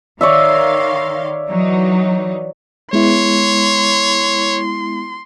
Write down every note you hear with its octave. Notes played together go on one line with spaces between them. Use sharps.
D#3 C#5 D5 E5 F5 C6
E3 F#3 D#4
G#3 B3 E4 C#5 C6